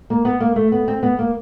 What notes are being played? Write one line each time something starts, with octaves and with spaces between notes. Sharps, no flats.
A#3
B3
A#3
A3
B3
C4
B3
A#3